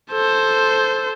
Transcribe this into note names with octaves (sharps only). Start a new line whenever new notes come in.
A4 C5